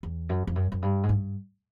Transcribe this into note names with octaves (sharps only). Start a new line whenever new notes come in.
E2
F#2
F2
F#2
F#2
G2
G#2
G2